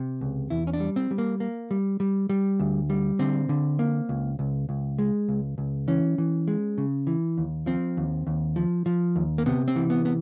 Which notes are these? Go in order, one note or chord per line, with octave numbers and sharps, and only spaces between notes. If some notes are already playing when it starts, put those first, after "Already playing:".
Already playing: C3
C#2
E2 E4
C#4
D4
G3
C4
G3
A#3
A#3
G3
G3
G3
D2
G3
D3 C4
D3
A#3
C#2
C#2
C#2
G#3
C#2
C#2
E3 C#4
E3
G#3
C#3
E3
D#2
F3 C4
D#2
D#2
F3
F3
D#2
A#3
C3 B3
C4
E3
B3
B3